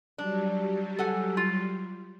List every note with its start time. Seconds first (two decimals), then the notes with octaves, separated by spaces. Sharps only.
0.18 F#3 G3 D4
0.98 A4 F#5 G#5
1.37 F4